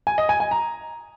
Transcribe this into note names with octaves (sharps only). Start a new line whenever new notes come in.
G#5
D#5
G#5
G#5
A#5